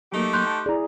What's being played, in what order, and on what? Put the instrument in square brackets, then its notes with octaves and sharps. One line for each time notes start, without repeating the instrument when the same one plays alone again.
[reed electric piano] F#3 A#3 [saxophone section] A3 D#4 G4
[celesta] C6 F#6 G6
[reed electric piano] A5
[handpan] E4 G#4 [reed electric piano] D5 A#5